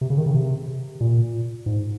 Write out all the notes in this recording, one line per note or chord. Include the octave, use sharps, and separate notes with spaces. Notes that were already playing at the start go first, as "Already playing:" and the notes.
C3
C#3
D#3
C#3
C3
A#2
G#2